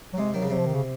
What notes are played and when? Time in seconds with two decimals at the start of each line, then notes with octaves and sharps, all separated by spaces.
0.13 F#3
0.17 C3 G#3
0.34 D#3 F#3
0.42 C#3
0.50 C3 F#3
0.57 F3
0.66 D#3
0.74 C#3